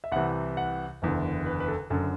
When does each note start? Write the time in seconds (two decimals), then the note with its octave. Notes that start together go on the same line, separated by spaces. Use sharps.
0.04 E5
0.12 C2 C3 E3 F#5
0.57 F#5
1.02 F#1 E2 D3
1.46 B4
1.60 B4
1.68 A4
1.90 F#1 F#2 D3 A4